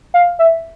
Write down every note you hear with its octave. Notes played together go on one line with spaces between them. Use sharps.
F5
E5